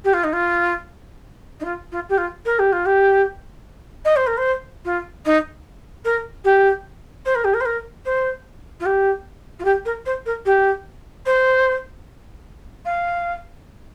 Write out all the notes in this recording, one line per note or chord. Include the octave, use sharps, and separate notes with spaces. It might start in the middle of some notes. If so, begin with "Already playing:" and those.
G4
F4
D#4
F4
D#4
F4
F4
G4
F4
A#4
G4
F4
G4
D#5
C5
A#4
C5
F4
D#4
A#4
G4
C5
A#4
G4
A#4
C5
A#4
C5
F4
G4
F4
G4
A#4
C5
A#4
G4
C5
F5